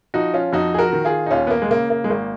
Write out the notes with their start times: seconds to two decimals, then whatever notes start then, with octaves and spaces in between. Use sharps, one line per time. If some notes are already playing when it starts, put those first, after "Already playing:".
0.14 F3 D#4 F#4
0.34 C#4 F4
0.53 F2 D#4 F#4
0.74 G#4
0.78 F#4 A#4
0.93 D#3
1.05 F4 G#4
1.26 D#4
1.31 D#2 C#4 F4
1.47 B3
1.50 A#3
1.62 G#3
1.70 C#3 A#3
1.90 A#3
2.04 G#3
2.10 G#1 A#3